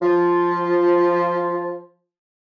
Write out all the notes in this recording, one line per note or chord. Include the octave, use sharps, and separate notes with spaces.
F3 F4